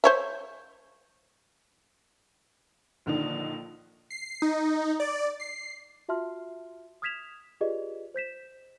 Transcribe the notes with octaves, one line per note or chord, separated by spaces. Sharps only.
C5 C#5 E5
A#1 D3 D#3 D#4
C7
D#4
D5
C7
F4 F#4 E5 A5 C6 F6
D#6 F6 G#6 B6 E7 F7
F4 G4 G#4 B4 D5 D#5
C5 G6 B6 E7